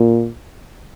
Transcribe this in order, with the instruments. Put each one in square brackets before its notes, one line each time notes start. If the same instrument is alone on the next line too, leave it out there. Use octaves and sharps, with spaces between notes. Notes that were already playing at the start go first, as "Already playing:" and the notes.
Already playing: [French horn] A#2